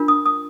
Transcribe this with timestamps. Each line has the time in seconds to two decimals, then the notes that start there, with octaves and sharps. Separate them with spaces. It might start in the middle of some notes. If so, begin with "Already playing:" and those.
Already playing: D4 F4 A#4
0.08 D#6
0.26 D#6